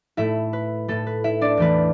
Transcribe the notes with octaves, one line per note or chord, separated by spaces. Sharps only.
A2 A3 E4 E5
B4
A2 A3 A4
B4
E4 E5
D4 D5
E2 E3 A3 B4